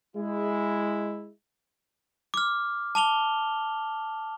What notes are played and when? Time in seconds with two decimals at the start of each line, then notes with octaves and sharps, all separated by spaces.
0.17 G#3 E4
2.34 D6 F6
2.95 A5 D6 F7 G7